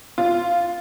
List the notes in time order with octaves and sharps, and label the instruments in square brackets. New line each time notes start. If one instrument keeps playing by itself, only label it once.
[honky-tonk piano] F4